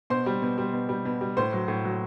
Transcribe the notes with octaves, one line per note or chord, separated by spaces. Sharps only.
B2 C5 C6
G3
B2
G3
B2
G3
B2
G3
A2 C5 C6
F#3
A2
F#3